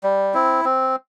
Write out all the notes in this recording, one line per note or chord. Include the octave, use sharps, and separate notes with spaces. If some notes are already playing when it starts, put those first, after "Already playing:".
G3
C4 E4
C4